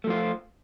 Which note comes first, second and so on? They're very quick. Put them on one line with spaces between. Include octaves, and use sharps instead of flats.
A3 F3 F4